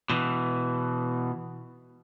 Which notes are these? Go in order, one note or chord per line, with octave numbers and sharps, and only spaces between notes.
B2 E3